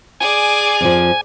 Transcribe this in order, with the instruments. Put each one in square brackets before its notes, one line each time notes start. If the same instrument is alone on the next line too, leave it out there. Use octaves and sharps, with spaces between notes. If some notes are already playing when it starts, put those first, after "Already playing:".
[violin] G#4 D5 [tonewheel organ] G#5
[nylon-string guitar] F2 F3